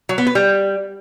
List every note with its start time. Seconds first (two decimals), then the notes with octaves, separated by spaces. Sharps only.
0.09 F#3
0.18 B3
0.27 B4
0.35 G3